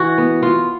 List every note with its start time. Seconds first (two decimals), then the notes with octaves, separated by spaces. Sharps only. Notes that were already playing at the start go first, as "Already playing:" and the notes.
Already playing: E3 F#4
0.18 B3
0.42 B3 F4